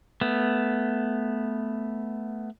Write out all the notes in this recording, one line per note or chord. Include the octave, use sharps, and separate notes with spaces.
A3 B3